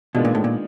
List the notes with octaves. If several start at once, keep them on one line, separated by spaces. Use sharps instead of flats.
B2 D#3 G#3 B3 D4 F4
A#2
A2
A#2